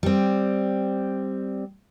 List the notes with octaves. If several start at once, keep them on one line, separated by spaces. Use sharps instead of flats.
G3 C4